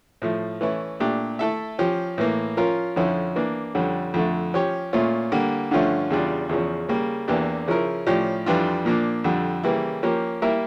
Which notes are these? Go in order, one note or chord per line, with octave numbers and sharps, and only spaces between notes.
A2 F3 A3
E3 A3 C#4 E4
A#2 A3 D4 G4
A3 E4 A4 E5
F3 C#4 G4
A2 E3 A#3
F3 C#4 F4 A#4
F2 D3 F3 C#4 E4
E3 A#3 D4
F2 D3 G3 C#4
F2 D3 A3
F3 C#4 G4 C#5
A#2 A3 C#4 F4
D3 G3 A#3
G2 D3 F3 A3 C#4
E2 C#3 G3 D4 F4
E2 C#3 F3 C#4
C#3 G3 A#3
E2 E3 A#3 D4 G4
C#3 F3 C#4 E4 A#4
A2 F3 C#4 G4 D5
F2 E3 G3 D4 F4
A#2 F3 A#3 D4
F2 D3 G3
C#3 E3 G3 A#3 E4
F3 A#3 C#4 G4 A#4
G3 A#3 E4 A#4 E5